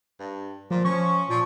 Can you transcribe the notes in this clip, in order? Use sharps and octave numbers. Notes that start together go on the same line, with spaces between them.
G2
A#2 F3
F3 C#4 C#6
A#2 F3